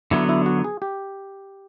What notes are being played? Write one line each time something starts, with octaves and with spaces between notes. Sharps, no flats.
D3 F#3 B3 E4
E4
F#4
G#4
G4